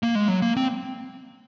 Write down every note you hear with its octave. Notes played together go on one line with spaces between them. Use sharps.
A#3
G#3
F#3
A#3
C4